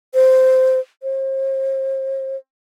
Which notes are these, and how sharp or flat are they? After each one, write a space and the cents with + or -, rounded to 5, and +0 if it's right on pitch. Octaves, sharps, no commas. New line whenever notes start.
C5 -10
C5 +40